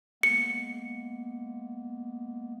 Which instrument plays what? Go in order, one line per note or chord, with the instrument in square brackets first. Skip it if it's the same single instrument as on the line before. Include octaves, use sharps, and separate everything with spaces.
[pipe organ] G#3 A#3 B3 [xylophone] C#7